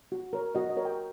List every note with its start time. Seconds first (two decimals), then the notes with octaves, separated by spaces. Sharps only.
0.12 F#4
0.33 A#4 C#5
0.55 F#4 D#5
0.69 D#5
0.77 A#4 C#5
0.85 G5